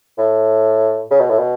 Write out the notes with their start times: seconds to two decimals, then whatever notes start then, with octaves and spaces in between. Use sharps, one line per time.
0.18 A2
1.11 C#3
1.21 B2
1.30 A2
1.38 B2